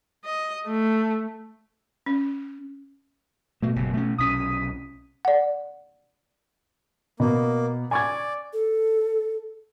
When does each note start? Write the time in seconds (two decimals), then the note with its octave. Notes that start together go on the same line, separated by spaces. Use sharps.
0.25 D#5
0.67 A3
2.06 C#4
3.63 B2 A3 A#3
3.76 F#1 C3
3.94 A3 C#4
4.18 B1 C3 C#4 D#6 B6 D#7
5.25 D5 F#5
7.20 B2 A#3
7.91 D5 G#5 C#6 G#6
8.53 A4